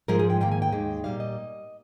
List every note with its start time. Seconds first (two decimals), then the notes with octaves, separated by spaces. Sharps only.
0.08 G#2 F3 G#3 A#4
0.19 G#4
0.30 G5
0.41 G#2 D#3 A#3 G5
0.52 G#5
0.62 G5
0.72 D#2 D#3 G#3
1.04 A#2 G3 A#3 F5
1.20 D#5